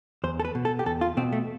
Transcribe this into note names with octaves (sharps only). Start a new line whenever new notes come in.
E2 C5
A4
B4
B2
A4
G4
E2 A4
F4
B2 C4
A3